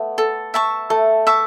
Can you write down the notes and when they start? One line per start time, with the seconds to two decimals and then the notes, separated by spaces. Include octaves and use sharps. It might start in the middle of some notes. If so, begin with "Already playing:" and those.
Already playing: A3 B3
0.18 A4
0.54 E5 A5 C#6
0.90 A3 A4
1.27 E5 A5 C#6